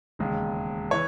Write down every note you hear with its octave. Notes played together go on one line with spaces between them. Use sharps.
E1 D#2 C#3 G#3
E3 C#5